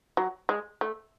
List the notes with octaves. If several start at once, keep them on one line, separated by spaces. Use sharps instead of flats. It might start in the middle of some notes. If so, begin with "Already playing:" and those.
F#3
G#3
A3